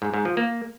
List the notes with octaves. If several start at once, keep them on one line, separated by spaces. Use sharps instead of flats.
G#2
G#2
F3
A#3